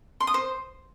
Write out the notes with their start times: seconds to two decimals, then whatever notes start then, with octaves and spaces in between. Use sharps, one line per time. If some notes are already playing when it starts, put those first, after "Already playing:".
0.20 C6
0.27 D#6
0.34 C5